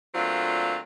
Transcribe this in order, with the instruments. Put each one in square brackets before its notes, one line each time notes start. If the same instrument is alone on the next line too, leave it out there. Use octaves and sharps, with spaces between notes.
[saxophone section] A#2 F#3 A3 C4 D4 F4